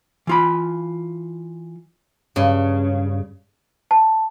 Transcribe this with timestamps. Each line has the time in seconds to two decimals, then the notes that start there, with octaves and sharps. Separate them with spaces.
0.27 E3 F4 B5
2.36 G2 C#3
3.91 A5